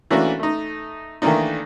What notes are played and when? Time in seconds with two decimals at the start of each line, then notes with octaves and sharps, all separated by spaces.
0.11 E3 A3 A#3 C#4 D4 F#4
0.40 A3 D#4
1.22 D#3 E3 A3 A#3 D4 D#4